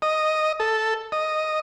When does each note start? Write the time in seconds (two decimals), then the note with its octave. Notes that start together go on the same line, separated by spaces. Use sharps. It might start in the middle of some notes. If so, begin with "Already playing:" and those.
0.02 D#5
0.60 A4
1.12 D#5